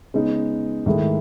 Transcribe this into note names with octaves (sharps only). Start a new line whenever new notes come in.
C#3 G#3 B3 D#4
G#2 D#3 A3 E4 G#4